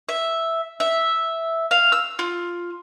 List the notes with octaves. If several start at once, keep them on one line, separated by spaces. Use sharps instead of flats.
E5
E5
F5
E6
F4